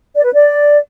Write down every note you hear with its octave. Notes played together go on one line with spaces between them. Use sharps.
D5
B4
D5